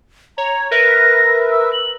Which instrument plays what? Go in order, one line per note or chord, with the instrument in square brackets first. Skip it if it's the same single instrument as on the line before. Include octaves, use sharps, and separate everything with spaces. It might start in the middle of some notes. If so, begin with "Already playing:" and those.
[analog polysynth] C#5 [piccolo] A#5
[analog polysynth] A#4 B4 E5 [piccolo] A#6
[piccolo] E6
F#7